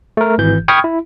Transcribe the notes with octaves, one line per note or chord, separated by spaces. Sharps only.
A3 A#4
G#1 E3 G6
G5 B5 C#6 D#6 F6 G#6
E4